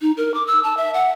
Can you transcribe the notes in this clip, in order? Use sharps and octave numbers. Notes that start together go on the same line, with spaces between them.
D#4
A#4
D6
E6
A5
E5
F#5